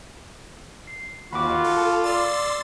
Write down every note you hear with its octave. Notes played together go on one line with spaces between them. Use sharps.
C7
D#2 F4 F#4 B5 D6
A4
D5 C6 E6 A6